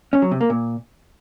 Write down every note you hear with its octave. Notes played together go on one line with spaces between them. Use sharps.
C#4
F#3
C3
A#3
A#2